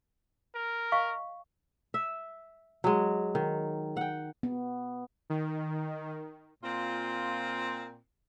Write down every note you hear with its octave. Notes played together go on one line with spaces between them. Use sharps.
A#4
D#5 F5 C#6
E5
F#3 G#3
D#3
F#5 G5
B3
D#3
A#2 C4 F4